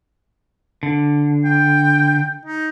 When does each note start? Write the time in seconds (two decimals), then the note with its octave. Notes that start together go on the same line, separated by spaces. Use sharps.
0.83 D3
1.45 G5
2.45 D#4